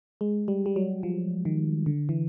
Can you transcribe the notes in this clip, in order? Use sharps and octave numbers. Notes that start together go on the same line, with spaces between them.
G#3
G3
G3
F#3
F3
D#3
D3
E3